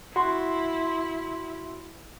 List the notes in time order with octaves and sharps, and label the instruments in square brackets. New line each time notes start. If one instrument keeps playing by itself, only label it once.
[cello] E4 [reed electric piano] F#4 [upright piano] C6